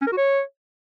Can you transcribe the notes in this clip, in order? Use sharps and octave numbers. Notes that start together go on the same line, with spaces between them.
C#4
A#4
F#4
C#5